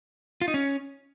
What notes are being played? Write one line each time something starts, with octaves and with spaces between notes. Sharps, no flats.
F4
D#4
C#4